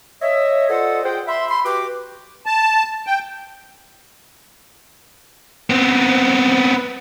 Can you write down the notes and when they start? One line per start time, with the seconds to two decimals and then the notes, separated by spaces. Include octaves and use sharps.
0.21 C#5 D#5 E5
0.69 F4 A4 C5 D5 D#5 F#5
1.04 F4 G#4 C5 F#5 G5
1.27 E5 B5 C6
1.49 B5 C6
1.65 F#4 G4 B4 G5 D6
2.46 A5
3.07 G5
5.70 B3 C4